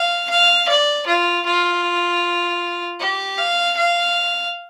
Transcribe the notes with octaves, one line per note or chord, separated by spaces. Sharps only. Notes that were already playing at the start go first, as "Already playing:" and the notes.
Already playing: F5
F5
D5
F4
F4
G4
F5
F5